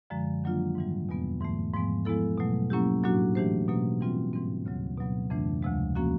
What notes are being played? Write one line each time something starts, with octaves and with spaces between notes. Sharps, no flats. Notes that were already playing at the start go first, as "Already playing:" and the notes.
F#2 D3 F3 G#3
D#3 F#3 A#3 D4 F4
G#2 E3 G3
E2 B2 G3 B3
G#2 E3 A3
G#2 F3 G#3 B3
F3 G#3 B3 E4 A4
B2 F#3 A3
F#3 A#3 C#4 E4 G4
A2 F#3 A#3 D4 F#4
E3 A3 D4 G4 C5
B2 F#3 A#3 C#4
E3 G3 C4 F4
G#2 E3 G3 C4
D2 C#3 F#3
B2 F#3 B3
F2 C#3 E3 A3 D4
D2 C3 F3 G#3
F3 A#3 C#4 F#4